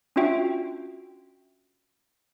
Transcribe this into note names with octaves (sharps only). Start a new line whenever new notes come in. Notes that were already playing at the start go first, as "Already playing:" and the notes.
C#4 D4 F4 F#4 E5 G5